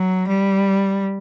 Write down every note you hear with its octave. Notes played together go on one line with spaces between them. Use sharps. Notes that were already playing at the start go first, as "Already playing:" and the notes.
Already playing: F#3
G3